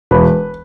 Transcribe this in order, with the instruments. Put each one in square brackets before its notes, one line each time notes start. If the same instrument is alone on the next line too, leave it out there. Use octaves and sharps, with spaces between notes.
[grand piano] E1 B4